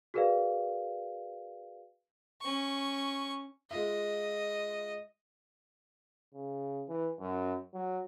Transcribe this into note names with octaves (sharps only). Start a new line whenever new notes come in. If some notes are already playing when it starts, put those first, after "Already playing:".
F#4 G#4 A#4 B4 D5 F5
C#4 C#6
G#3 F4 D#5 E5
C#3
E3
F#2
F#3